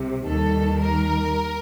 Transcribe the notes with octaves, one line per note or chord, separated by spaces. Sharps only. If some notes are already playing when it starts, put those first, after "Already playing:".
Already playing: C2 C3
D#2 D#3 G3 A4
A#4